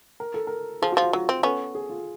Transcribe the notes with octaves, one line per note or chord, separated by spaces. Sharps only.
A#4
A4
A#4
F3 G#4
F#4
F3
F4
F#3 F4
C4
B3 C#4 A4
G#4
F4